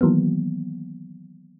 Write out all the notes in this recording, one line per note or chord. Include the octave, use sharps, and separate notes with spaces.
D#3 E3 F#3 A#3 B3